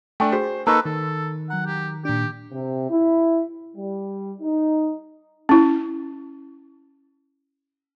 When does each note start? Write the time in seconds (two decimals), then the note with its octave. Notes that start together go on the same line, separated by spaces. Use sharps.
0.20 A3 D4 G5 G#5 C#6
0.32 F#4 G#4 C5
0.67 A#3 D#4 A4 B4 A#5 C#6
0.85 D#3 A4
1.50 F#3 F#5 A#5
1.67 G4
2.05 A#2 D4 G4
2.52 C3
2.90 E4
3.76 G3
4.42 D#4
5.49 C#4 E4